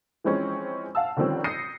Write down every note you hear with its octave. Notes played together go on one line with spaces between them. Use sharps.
E3 F3 G#3 C4 C#4
F5 F#5 A5 E6
D3 D#3 F3 G3 C4 C#4
D#6 G6 A#6 C7 C#7 D#7